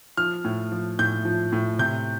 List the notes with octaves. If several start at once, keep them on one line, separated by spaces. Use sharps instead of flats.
F3 F6
A2
F3
A2 G6
F3
A2
C3 G6